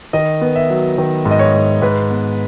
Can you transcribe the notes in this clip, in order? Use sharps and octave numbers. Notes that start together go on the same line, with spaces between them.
D#3 D#5
B3
E5
F#3
D#3
G#2
D#5
C#5
G#2
G#2 B4
B3